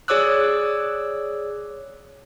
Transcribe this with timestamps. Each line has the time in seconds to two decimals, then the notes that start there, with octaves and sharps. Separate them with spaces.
0.08 G#4 C#5 D5 D6 E6 F#6